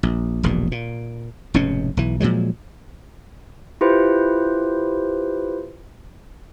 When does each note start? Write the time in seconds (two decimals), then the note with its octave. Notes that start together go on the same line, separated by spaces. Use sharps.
0.03 A#1
0.43 E1 A#1 G2
0.72 A#2
1.54 F1 G#2 B2 C#4
1.97 B1 E3
2.20 A#2 F3 F#3 G#3
3.81 E4 F4 G4 B4 C5